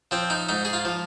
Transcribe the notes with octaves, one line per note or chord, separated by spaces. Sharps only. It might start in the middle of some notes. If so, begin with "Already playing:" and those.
F3 C4
D#4
G#2 D#4
G#4
F4
F3